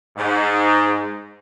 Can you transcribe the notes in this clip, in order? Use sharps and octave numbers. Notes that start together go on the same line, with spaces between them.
G#2